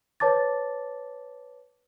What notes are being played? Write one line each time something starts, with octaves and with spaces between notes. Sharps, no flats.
B4 C#5 A5 D6 A6